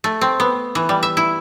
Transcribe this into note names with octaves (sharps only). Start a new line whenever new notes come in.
A3
C4
B3
E3
G3
E5
E4